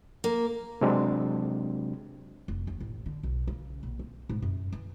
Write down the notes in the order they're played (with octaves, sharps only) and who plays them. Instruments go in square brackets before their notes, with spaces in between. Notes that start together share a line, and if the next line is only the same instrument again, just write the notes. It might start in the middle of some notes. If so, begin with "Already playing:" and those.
[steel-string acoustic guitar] A#3
[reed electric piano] C3 F#3 G#3 C4 D4
[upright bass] F1
D#2
A1
D3
B1
C#3
A#1
C4
G#2
F#2
E3